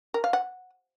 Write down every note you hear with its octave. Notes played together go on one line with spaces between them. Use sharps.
A#4
F5
F#5